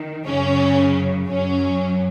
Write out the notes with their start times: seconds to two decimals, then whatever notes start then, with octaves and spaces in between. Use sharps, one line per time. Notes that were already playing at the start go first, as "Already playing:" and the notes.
Already playing: D#3
0.26 F#2 C#3 F#3 C#4
1.27 F#2 F#3 C#4